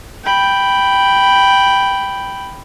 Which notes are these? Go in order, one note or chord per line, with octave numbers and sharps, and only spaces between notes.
G5 B5